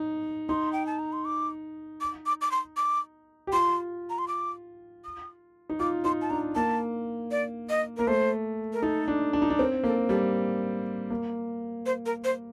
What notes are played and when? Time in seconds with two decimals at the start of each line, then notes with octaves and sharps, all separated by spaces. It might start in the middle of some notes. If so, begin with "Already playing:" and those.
Already playing: D#4
0.49 D#4 C6
0.73 G5
0.86 A5
0.99 A#5
1.12 C6
1.25 D6
2.01 D6
2.26 D6
2.41 D6
2.51 C6
2.77 D6
3.47 G4
3.52 F4 C6
4.10 A#5
4.18 C6
4.28 D6
5.04 D#6
5.69 D#4
5.80 F4 D6
6.04 D#4 C6
6.21 A5
6.30 D4 A#5
6.55 A#3 A5
7.31 D5
7.69 D#5
7.97 A#3 A#4
8.07 A3 C5
8.73 A#4
8.82 D#4 A4
9.08 D4
9.33 D4
9.42 D#4
9.50 D4
9.59 C4 A#4
9.84 A#3 A4
10.09 G3 A4
11.10 A#3
11.86 C5
12.06 A#4
12.24 C5